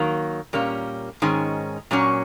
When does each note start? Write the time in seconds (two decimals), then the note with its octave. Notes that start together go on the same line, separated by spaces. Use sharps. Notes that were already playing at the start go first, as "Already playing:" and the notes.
Already playing: D#3 F#3 A#3
0.53 A#2 G3 A#3 C#4
1.22 G#2 D#3 G#3 C#4
1.91 A#2 F#3 A#3 C#4